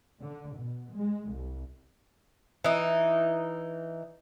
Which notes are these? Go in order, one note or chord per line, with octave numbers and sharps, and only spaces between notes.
D3
B2
G#3
C2
E3 D#4